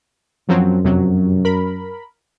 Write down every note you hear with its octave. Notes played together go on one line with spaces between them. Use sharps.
F#2 F3 F#3 C4
F2 C3 F#3
A#4 B5